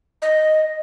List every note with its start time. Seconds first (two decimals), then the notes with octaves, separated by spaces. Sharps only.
0.22 D#5